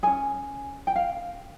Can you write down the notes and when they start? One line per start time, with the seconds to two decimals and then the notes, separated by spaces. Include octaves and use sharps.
0.03 C#4 G#4 G#5
0.87 G5
0.96 F5